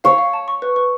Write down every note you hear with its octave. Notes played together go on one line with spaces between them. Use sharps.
C#5 F5
F5
A5
C#6
B4
B4